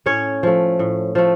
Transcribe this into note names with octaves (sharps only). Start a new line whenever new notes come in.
A2 C#4 C#5
F3 A3
A2
F3 A3